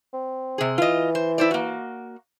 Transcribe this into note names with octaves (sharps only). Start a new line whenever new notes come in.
C4
C3 G#4
E3 F4 D#5
C5
E4 C5 D5
A#3 F#4